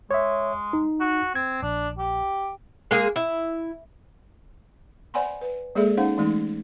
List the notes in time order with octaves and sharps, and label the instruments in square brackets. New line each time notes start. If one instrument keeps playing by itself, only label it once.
[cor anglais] G#3 [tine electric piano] C#5 E5
[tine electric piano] D#4
[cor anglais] F#4
[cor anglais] C4 [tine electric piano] G#6
[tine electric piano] A#1 [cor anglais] D4
[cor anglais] G4
[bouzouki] G#3 A#3 G#4
E4
[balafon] C5 D5 F#5 G#5 B5 C6
B4
G#3 A#3 G#4 A4 D5 E5
C#4 D#4 C5 F5 F#5
E3 G#3 A3 D#4